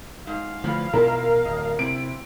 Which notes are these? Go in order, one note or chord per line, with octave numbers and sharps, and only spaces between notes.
G#2 F5
D3 E3 F3 A3
B2 E3 E4 F4 A#4
D1 D#5
C3 C4 E4 D7